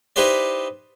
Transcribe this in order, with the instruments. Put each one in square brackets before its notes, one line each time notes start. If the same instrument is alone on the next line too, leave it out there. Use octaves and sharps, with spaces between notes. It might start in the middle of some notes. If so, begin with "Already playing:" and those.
[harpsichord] D#4 E4 G4 B4 C5 D5